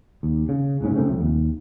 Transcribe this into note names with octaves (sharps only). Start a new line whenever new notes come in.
D#2
C#3
F#1 C2 G#2 C#4
C3 A3 C4 C#4
C2 F2
D#2